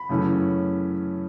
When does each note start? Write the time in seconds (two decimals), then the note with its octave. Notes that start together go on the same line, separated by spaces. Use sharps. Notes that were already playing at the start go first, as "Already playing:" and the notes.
Already playing: B5
0.09 F#2 C#3 E3 A3 C#4